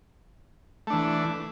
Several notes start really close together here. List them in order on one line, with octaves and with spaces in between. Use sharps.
A3 D4 E3